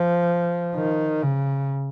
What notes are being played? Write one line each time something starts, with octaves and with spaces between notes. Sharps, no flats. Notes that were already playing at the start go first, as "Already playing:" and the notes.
Already playing: F3
D#3
C#3